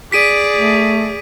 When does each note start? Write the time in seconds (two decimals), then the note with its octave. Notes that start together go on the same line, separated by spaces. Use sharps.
0.12 G#4 D5 B6 D7 D#7
0.56 A3